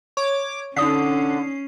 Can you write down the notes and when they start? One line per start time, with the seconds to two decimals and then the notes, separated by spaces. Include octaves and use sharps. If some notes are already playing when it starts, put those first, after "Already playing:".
0.17 C#5 C#6 D6
0.76 D3 C#4 D#4 D#6 B6 C7